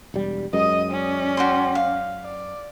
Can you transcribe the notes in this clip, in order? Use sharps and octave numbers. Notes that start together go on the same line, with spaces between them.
E1 G3
F#2 G#3 D#5 D#6
C#4 D5
F#4 G5 C6
F5
D5